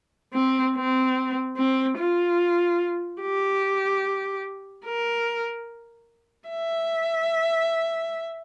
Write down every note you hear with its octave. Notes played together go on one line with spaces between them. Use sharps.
C4
C4
C4
F4
G4
A#4
E5